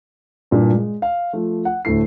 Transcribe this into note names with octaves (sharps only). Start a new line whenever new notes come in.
G2 A#2 D4 E4
G#3
F5
F3 A3
F#5
D2 A2 A3 E4 C7